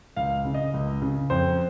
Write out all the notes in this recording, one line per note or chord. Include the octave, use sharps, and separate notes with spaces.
C#2 F5
C#3
D#5
C#2
C#3
F2 C5